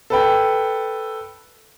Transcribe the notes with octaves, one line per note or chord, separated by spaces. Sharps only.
A4 B4 G5